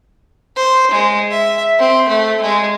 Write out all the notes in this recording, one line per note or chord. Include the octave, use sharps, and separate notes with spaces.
C5
G#3
E5
C4
A3
G#3